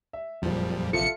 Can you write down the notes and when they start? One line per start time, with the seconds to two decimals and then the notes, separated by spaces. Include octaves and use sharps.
0.13 E5
0.42 F#1 F2 A#2 F3 G3
0.93 A#1 C3 F3 F4 A4 E5 C#7